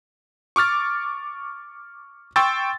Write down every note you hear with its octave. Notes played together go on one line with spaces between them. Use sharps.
C#6 D6 F6 A6
G5 C6 C#6 E6 A6